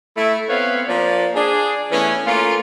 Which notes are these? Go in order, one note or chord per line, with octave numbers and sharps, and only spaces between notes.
A3 E4
B3 C4 B4 C#5 F5
F3 A#3 D4 D5
D4 G#4
E3 A3 B3 C#4
A3 A#3 C#4 F4